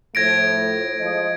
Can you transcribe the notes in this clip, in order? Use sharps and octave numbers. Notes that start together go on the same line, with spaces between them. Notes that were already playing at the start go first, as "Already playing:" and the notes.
A2 F3 A3 G#6 A#6 D7
F3 G#3 D#5